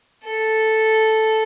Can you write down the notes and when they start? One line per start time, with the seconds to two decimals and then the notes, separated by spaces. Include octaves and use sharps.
0.25 A4